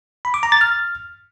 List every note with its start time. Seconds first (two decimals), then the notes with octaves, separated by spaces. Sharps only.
0.25 B5
0.34 D6
0.43 A#5
0.52 A6
0.61 F6